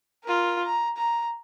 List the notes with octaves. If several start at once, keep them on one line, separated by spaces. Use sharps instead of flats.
F4 A#4
A#5
A#5